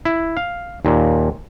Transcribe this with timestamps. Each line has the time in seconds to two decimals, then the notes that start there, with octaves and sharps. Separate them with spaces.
0.05 E4
0.37 F5
0.85 D#2 A#2